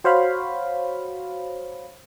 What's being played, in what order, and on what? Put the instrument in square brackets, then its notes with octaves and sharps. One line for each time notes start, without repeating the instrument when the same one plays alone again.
[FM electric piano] F#4 C5 C#5 F5 B5